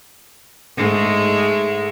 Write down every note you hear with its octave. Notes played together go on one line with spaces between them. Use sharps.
G#2 G#3 A3